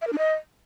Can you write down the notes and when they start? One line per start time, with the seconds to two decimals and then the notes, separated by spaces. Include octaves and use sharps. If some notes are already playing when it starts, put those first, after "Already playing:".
0.02 E5
0.07 A#4
0.13 D4
0.18 D#5